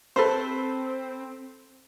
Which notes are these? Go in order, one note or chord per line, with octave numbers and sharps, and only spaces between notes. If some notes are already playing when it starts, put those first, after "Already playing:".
C4 A4 B4 C5